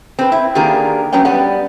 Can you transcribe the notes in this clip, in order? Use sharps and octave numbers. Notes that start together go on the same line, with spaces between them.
C4 B4
E4
D3 D#3 A#3 G4 G#4 A#4
F#3 B3 C#4 C#5 G5
G3 B3 F#5